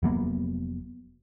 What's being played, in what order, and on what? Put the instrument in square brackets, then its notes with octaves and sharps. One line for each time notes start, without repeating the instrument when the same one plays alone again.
[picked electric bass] F1 F#3 A#3 B3